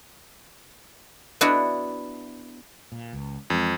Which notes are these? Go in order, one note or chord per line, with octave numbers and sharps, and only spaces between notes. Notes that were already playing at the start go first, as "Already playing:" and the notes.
B3 D4 E4 F#4
A#2
C#2
F2 E3 G#3 C4